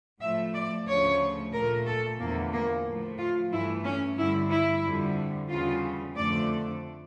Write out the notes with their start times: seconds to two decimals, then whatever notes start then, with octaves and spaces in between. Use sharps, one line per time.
0.21 A2 F3 A3 E5
0.54 D5
0.87 D2 C#3 F3 A3 C#5
1.53 A#2 A3 A#4
1.87 A4
2.19 E2 D3 F3 A3 A#3
2.52 A#3
2.86 A2 F3 A3
3.19 F4
3.52 G2 E3 A3 E4
3.85 C#4
4.17 G2 D3 G3 E4
4.50 E4
4.83 F2 D3 G3
5.49 E2 C#3 G3 F4
6.16 F2 D3 A3 D5